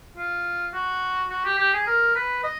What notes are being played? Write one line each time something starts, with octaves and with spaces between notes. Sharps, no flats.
F4
F#4
F#4
G4
G4
G#4
A#4
B4
D#5